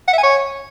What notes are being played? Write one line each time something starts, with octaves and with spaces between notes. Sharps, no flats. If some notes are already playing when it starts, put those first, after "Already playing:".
F#5
E5
G#5
C#5